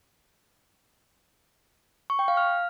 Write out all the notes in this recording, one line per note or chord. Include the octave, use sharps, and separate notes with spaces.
C#6
G5
F5
F6